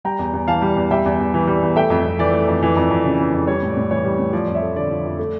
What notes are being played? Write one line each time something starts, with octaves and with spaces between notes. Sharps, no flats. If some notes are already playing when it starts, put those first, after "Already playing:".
G3 G5 A#5
E2
E2
E3 F5 A5
G3
E2
G3 E5 G5
E2
E2
E3
G3
E2
A3 E5 G5
F2
F2
E3 D5
A3
F2
E3
F2
F2
C#3
E3
F2
G3 C#5
A2
D5
A2
E3 C#5
G3
A2
F3 D5
F2
C#5 E5
A3
D3 D5
F3
F2
A3